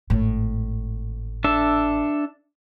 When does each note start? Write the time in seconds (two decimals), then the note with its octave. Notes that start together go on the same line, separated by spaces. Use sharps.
0.10 G#1 A2
1.44 D4 A4 E5